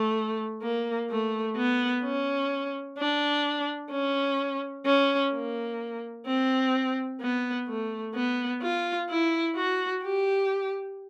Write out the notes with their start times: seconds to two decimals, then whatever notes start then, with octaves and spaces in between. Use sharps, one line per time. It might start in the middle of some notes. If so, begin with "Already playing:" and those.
Already playing: A3
0.63 A#3
1.10 A3
1.56 B3
2.04 C#4
2.98 D4
3.91 C#4
4.86 C#4
5.33 A#3
6.27 C4
7.21 B3
7.68 A3
8.15 B3
8.62 F4
9.10 E4
9.56 F#4
10.03 G4